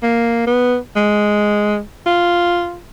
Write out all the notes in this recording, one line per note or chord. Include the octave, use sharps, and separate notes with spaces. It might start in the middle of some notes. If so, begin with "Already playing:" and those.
A#3
B3
G#3
F4